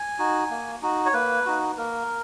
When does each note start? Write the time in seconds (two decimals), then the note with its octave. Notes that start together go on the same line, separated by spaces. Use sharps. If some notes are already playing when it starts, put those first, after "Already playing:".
Already playing: G#5
0.19 D#4 F#4
0.51 A#3
0.82 D#4 F#4
1.06 C#5
1.14 A#3 B4
1.46 D#4 F#4
1.77 A#3 A#4